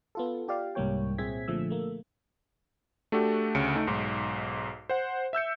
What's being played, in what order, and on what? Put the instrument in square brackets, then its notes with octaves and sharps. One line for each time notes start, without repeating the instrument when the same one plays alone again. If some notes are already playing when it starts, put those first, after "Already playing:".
[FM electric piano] B3 F4 A4
F4 G4 D5 F5
C2 G#2 G3 A#3 C#5 G5
A#2 C4 G#4 E5 G#6 B6
A#2 D3 F3 A3 E6
A3 A#3
[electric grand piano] A3 D4 F#4 G4 A4
D2 C#3 C#7 D7
A3 D#4
B1 G#2
C5 F#5
E5 E6 G6 C#7